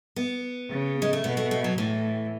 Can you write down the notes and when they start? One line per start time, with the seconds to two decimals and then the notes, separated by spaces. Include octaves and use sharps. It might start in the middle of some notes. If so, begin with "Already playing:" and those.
0.16 B3
0.70 C#3
1.02 G#3
1.13 A3
1.24 B2 B3
1.37 A3
1.51 A3
1.64 F#3
1.78 A2 E3